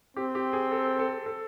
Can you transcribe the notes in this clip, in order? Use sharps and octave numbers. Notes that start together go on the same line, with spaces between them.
C4 G4
G4
G#4
A4
A4
A4